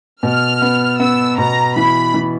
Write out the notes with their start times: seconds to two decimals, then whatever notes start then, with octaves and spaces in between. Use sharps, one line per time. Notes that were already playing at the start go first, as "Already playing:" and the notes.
0.23 B2 F6
0.62 B3
0.99 B3 E6
1.38 B2 A#5
1.75 E3 B5
2.14 E3